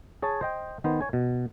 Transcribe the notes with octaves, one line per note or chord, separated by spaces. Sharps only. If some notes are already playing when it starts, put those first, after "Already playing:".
G#4 C#5 G#5 A5
C5 D#5 G5
D#3 B3 C5
C#5 G#5
B2